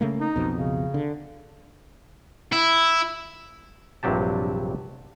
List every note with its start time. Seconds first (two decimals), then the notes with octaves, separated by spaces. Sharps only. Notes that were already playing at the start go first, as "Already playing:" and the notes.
0.01 C#3 A3 A#3
0.20 D#4
0.36 B1 F2 B2
0.57 C#3
0.94 D3
2.53 E4
4.03 A#1 G2 C3 F#3 G4 A5